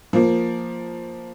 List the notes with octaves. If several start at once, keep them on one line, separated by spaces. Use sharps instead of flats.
F3 A#3